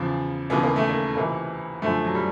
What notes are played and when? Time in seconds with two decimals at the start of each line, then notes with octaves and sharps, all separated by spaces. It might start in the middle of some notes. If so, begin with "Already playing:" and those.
Already playing: E2 C#3 F3
0.50 D#2 C#3 E3 B3
0.63 A#3
0.76 A3
0.90 A#3
1.16 C#2 C3 E3 A#3
1.82 F#2 D3 F3 A3
2.05 F#3
2.15 G3